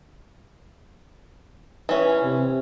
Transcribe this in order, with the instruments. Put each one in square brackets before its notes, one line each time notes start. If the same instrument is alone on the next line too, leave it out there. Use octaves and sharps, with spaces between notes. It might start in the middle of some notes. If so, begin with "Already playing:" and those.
[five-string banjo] E3 C#4
[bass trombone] C3